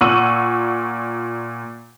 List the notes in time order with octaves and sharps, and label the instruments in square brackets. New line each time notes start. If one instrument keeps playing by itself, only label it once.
[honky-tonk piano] A#2 F#5 C#6 E6 D#7 F#7